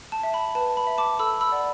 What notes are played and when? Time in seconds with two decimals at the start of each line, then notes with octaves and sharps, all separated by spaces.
0.12 A5
0.23 E5
0.34 B5
0.55 B4 A5
0.77 B5
0.87 E5
0.98 A5 D6
1.19 A4 B5 E6
1.41 B5 E6
1.52 D5 F#5